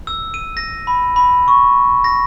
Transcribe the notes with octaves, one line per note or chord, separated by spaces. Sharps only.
E6
D#7
A#6
B5
B5
C#6
A#6